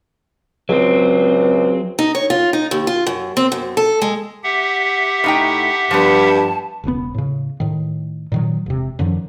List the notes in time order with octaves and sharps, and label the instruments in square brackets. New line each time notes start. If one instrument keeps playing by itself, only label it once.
[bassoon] C#2 [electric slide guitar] F#3 C4
[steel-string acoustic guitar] D#4
C#5
F4
D#4
D#2
F4
F#2
C4
F#2
A4
G#3
[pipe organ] G4 E5 F#5
[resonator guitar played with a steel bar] A2 D#4 G5
[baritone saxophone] G2 [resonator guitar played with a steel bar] F3 B3 [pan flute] A5
[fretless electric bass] E1 C#2 C3 B3
A2 C#3
A2 D#3
A#2 D#3 F#3
E1 C3
F#2 D3 D#3 F3